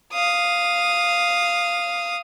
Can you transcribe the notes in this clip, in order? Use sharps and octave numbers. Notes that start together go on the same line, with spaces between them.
F5 D#6